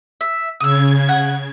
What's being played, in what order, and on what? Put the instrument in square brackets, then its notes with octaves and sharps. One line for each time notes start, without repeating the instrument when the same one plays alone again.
[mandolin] E5
[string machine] C#3 G#6 [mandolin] D#6 E6
[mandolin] F#5